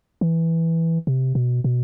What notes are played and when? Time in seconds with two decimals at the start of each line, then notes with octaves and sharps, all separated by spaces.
0.21 E3
1.07 C3
1.35 B2
1.64 B2